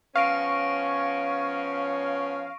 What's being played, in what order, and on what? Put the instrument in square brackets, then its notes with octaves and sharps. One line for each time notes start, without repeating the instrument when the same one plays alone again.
[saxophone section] F3 B3 C#4 [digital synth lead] F5 [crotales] C#6 A#6 D7